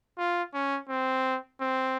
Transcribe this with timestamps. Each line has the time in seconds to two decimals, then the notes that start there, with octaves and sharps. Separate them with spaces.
0.18 F4
0.54 C#4
0.89 C4
1.60 C4